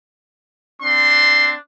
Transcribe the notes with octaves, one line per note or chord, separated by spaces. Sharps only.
C4 D4 C6